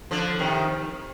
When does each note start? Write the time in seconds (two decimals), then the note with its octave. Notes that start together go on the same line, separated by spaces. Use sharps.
0.11 D3 F3
0.39 C3 D#3